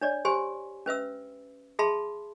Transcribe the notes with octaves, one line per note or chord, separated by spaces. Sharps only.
D4 C#5 D5
G4 C5 G#5 C6
C#4 B4 E5 E6
G#4 E5 A5 B5 C6